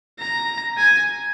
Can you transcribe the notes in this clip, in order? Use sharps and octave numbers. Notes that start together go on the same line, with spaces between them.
A#5
G#5